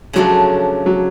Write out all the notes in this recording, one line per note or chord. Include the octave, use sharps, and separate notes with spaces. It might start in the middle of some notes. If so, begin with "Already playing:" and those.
C#3 F3 F#3 A3 D4 F#4
F#3